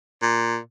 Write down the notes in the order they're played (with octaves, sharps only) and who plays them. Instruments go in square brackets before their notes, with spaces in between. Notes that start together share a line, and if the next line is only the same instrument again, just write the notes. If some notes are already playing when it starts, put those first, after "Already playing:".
[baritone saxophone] A#2